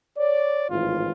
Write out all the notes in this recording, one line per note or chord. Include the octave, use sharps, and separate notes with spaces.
C#5 D5
G#1 A2 E3 F4